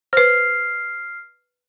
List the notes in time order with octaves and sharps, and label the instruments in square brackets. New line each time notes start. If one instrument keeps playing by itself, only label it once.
[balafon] B4 C5 [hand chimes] F6 C7